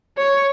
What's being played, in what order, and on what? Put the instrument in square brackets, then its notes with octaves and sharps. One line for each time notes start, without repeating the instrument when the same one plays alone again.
[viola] C#5